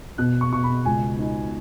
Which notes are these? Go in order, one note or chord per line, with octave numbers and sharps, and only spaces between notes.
B2 F#6
C#6
B2 C#6
B5
C#2 G#5
D#4